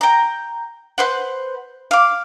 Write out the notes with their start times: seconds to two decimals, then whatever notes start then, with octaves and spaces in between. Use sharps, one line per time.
0.01 G5 A#5
0.98 B4 C5 F#5
1.91 F5 D6